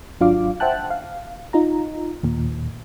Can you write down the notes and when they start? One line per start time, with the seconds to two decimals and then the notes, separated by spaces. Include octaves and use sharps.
0.20 G#1 F#3 D4 F4 F5 D6
0.60 C5 E5 F#5 G5 A5 F#6
0.90 F5
1.53 D#4 F4 A#5
2.23 D#2 A#2